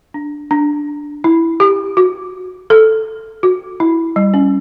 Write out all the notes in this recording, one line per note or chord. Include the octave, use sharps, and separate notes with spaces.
D4
D4
E4
G4
F#4
A4
F#4
E4
G3
C#4